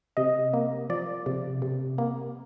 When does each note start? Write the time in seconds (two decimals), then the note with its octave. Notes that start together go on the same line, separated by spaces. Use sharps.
0.17 C3 D#5
0.53 A#3
0.90 F3 D5
1.26 C3
1.62 C3
1.98 A#3